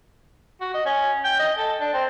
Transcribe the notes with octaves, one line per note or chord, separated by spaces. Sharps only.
F#4
D#5
C#4
G5
D#5
A4
D4
C4